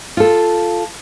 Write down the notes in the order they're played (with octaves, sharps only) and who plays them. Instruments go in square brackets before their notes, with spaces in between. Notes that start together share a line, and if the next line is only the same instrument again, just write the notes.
[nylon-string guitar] F4 A4